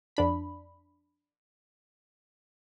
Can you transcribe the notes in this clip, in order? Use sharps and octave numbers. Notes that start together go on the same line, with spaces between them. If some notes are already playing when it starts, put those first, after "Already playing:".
F2 D4 B5